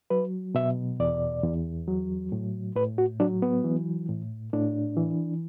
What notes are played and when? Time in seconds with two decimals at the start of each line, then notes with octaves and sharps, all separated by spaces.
0.10 F#3 B4
0.55 B2 E5
1.00 E2 D5
1.44 E2
1.87 F#3
2.32 A2
2.75 A2 B4
2.98 F#4
3.20 F#3 D4
3.42 B3
3.64 E3
4.09 A2
4.53 A2 D4
4.97 E3